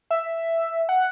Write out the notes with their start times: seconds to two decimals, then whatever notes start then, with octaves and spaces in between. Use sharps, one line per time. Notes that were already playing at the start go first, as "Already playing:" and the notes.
0.11 E5
0.89 F#5